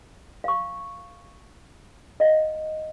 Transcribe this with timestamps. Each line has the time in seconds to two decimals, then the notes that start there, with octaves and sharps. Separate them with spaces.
0.44 F5 C#6
2.20 D#5 F5 F#5